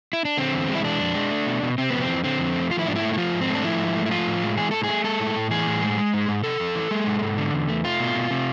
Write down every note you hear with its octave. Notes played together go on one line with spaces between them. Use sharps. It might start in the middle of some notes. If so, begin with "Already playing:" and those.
E4
D4
D3 C4
E2
G#3
E4
E3 D4
F2
G#3
A3
B2
B2
C3 C4
F2 B3
C4
E3
D3 C4
F2
A3
F3 F4
E4
G#2 D4
E4
A3
E4
F3 F4
G#2
C4
A3
D4
F3 E4
G#2
A3
E4
F3 F4
A2
G#3
E3 G#4
A2 A4
G#4
A3
G#3 A4
A2
A2
E3 G#4
A2
G#3
G#3
G#2
G#2
C3 A4
F2
E3
G#3
G#2
G#2
D3
E2
A3
A3 F4
B2
B2
C3